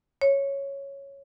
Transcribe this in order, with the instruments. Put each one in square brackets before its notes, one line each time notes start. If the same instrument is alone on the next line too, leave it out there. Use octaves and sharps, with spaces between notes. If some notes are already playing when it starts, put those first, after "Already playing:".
[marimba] C#5